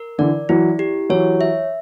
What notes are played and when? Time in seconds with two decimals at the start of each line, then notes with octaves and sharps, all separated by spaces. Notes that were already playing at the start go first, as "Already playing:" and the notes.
Already playing: A#4
0.18 D3 E3 D5
0.49 E3 F#3 E4
0.79 G4
1.10 E3 F#3 C#5
1.41 E5